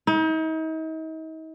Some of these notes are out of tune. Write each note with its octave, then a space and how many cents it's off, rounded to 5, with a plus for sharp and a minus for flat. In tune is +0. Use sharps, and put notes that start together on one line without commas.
D#4 +40